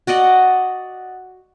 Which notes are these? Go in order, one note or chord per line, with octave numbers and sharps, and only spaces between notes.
F#4 D5 D#5 F#5